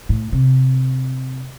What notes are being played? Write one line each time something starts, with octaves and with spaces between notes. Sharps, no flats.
A2
C3